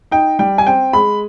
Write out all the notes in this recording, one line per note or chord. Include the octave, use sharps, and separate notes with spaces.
D#4 G5
G3 G5
G#5
C4 G5
G#3 B5